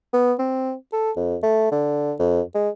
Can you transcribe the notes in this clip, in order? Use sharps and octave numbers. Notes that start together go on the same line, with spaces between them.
B3
C4
A4
F2
A3
D3
F2
G#3